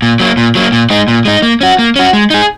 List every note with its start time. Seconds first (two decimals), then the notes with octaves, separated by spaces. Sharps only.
0.02 A#2
0.20 F#3 A#3
0.37 A#2
0.55 F#3 A#3
0.72 A#2
0.90 G#3 D#4
1.08 A#2
1.25 G#3 D#4
1.42 A#3
1.61 C#4 F#4
1.79 A#3
1.96 C#4 F#4
2.13 G#3
2.30 D#4 G#4